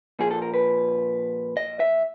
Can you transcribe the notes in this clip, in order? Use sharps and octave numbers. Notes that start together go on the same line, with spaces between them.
A#2 F3 G#4
A4
A#4
B4
D#5
E5